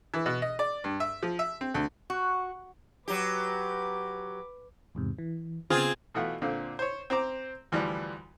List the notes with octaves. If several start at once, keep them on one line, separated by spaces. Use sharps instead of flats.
E3
B2
D#5
D5
G2
E5
F3
E5
C4
D2
F#4
F#3 G4 B4 D6
E2 G#2 C3
E3
C#3 B3 C4 F4 G#4
B2 E3 A3 F4 F#5
A#2 D3 C4 F4
C5 C#5
C4 C5 A#5 D6
D2 E3 F3 G3